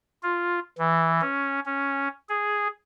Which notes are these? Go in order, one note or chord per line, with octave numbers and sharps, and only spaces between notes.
F4
E3
C#4
C#4
G#4